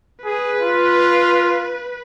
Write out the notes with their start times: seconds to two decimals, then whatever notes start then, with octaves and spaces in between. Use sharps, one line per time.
0.24 G#4 B4
0.61 F4